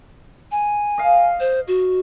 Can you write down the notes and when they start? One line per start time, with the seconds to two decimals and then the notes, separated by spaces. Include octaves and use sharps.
0.52 G#5
0.98 D#5 F5
1.40 C5
1.68 F#4